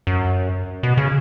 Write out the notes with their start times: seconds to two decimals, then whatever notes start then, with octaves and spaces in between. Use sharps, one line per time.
0.07 F#2
0.83 B2
0.97 C#3